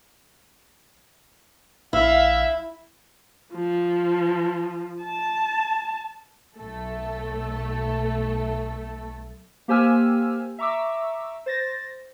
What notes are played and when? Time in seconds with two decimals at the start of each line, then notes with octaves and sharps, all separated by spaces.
1.93 A#1 E4 E5 F5
3.54 F3
5.03 A5
6.56 B1 A3 A4
9.68 A#3 G4 C5 G#5 E6 F6
10.59 E5 A#5 C#6 D6 E6
11.46 C5 A6 A#6